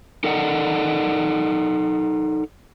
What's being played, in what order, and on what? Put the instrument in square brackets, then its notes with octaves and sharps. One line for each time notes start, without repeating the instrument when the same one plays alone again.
[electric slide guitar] D#4 A4 A#4 D5 D#5 F#5